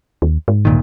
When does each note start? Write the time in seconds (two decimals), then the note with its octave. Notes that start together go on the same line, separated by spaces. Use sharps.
0.22 D#2
0.48 G#2
0.65 D2 A#2 D#3